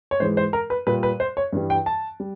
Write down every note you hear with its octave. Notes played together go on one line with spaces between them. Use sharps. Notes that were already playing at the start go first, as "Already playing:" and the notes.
C#5
G#2 E3 G#3 C5
C5
A#4
B4
A#2 G3 B4
B4
C5
C#5
G2 E3 G3
G5
A5
G3